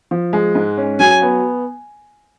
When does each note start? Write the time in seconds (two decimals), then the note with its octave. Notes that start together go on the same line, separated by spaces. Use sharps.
0.11 F3
0.33 G#3
0.55 G#2
0.78 C#4
1.00 F#3 G#5
1.22 B3